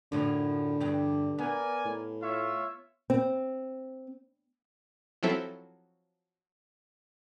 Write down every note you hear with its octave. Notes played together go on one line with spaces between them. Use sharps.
F#2 A2 D3 F3
E2 G2 G3
B3 A#4 D5 G#5
A2
F4 C#5 E5
C4
F3 F#3 C4 E4 A4 E5